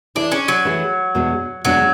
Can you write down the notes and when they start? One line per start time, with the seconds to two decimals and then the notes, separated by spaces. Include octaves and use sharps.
0.15 E3 A3 D4 E4 G#4
0.32 C#4
0.48 F#3
0.65 E3 A3 E4 G#4
1.15 E2 B2 G#3 D4 F#4
1.64 E2 B2 F#3 G#3 D4 F#4